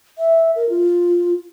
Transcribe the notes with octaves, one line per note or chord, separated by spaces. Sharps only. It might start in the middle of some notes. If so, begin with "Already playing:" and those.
E5
A#4
F4